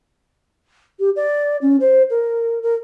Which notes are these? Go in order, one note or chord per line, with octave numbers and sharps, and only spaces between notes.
G4
D5
C#4
C5
A#4
A#4